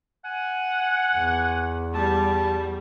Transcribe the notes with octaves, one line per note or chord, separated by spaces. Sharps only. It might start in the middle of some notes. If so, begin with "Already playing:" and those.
F#5 G#5
E2
G3 A5